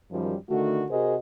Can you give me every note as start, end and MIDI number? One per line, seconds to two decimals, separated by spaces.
0.12 0.35 42
0.12 0.35 51
0.12 0.35 53
0.12 0.35 55
0.50 0.85 50
0.50 0.85 51
0.50 0.85 57
0.50 0.85 66
0.90 1.16 48
0.90 1.16 66
0.90 1.16 68
0.90 1.16 70
0.90 1.16 72
0.90 1.16 75